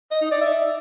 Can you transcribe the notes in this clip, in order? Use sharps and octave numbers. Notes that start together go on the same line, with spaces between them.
D#5
D#4
D5
E5